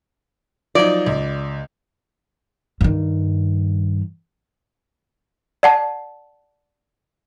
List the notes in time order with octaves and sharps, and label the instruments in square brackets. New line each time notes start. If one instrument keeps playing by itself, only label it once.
[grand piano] F3 F#3 D#4 [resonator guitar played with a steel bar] D5
[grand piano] C#2
[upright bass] G2 D#3
[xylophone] D5 F#5 A5